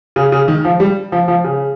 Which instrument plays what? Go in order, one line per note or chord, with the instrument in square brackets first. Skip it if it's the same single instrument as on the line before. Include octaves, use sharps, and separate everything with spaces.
[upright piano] C#3
C#3
D#3
F3
G3
F3
F3
C#3